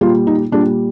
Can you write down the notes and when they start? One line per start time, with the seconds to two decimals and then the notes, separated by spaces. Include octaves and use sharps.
0.01 A#2 G3 F4
0.27 D#4
0.52 A#2 G3 D4